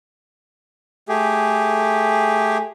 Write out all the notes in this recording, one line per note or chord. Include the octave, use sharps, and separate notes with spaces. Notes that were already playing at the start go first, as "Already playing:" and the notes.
A3 G4 G#4